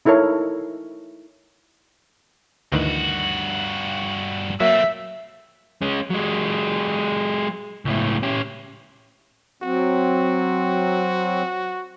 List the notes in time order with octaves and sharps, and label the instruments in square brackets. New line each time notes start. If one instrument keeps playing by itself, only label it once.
[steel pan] D#4 E4 A4 A#4 C#5
[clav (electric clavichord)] D2 D#3 E3 [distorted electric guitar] G2 F#4
[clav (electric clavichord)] F#3 A#3 [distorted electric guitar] A3 C4 [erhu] E5
[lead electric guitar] G#3 C#4
F#3 G#3
C#2 A2
C#4 G4
[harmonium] F#3 C4 [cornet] F#4